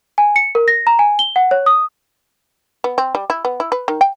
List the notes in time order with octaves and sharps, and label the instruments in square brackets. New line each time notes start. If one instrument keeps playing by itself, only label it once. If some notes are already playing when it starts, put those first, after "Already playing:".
[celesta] G#5
C#7
A#4
A#6
A#5
G#5
G7
F#5
C#5
D#6
[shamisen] B3
C4
G3
E4
B3
E4
B4
D#3
G5